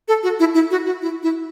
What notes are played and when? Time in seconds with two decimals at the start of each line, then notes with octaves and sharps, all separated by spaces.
0.08 A4
0.23 F#4
0.40 E4
0.54 E4
0.71 F#4
0.86 F#4
1.02 E4
1.23 E4